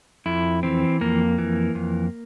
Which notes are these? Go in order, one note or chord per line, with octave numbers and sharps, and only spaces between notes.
F2 E4
E3 C4
F2 A#3
E3
F2